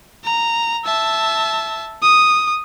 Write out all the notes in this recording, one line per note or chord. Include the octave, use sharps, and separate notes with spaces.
A#5
E5 A5
D#6